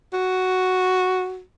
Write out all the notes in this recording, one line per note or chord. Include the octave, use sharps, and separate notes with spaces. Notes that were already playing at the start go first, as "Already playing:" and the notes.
F#4